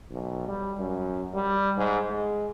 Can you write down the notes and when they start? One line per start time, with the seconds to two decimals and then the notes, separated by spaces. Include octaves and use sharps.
0.11 B1
0.48 G3
0.79 F#2
1.35 G3
1.77 G#2
2.10 G#3